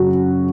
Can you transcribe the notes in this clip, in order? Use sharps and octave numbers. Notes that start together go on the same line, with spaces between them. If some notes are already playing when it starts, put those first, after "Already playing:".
Already playing: F#2 C#3 F#3 F#4